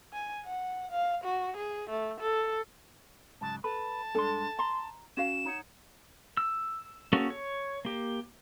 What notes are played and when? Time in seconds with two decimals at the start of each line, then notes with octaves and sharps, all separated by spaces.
0.13 G#5
0.46 F#5
0.92 F5
1.24 F#4
1.57 G#4
1.90 A3
2.21 A4
3.41 G#2 C#3 F#3 A5
3.64 A4 B4 A5
4.15 G2 G#3 D4 A4 C6
4.59 A#5 C6
5.17 C#4 F#4 F5 E7
5.45 D#4 C#5 F#5
6.37 E6
7.13 A#3 C#4 F#4 G#4 A4
7.30 C#5
7.85 A#3 G4